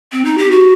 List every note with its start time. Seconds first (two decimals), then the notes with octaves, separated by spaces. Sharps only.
0.12 C4
0.25 D#4
0.38 G4
0.51 F#4